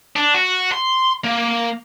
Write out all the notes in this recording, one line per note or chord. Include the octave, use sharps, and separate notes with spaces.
D4
F#4
C6
A#3